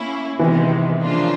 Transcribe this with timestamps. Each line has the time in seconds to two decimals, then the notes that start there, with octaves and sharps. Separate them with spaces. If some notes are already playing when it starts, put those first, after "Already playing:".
Already playing: A#3 C#4 E4
0.39 C3 D#3 E3 G#3 B3
1.01 C#3 F3 A#3 D4 F4